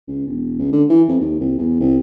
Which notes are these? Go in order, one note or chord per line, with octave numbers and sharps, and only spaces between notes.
C#2
E1
C#2
D3
E3
F2
D#2
C2
E2
C2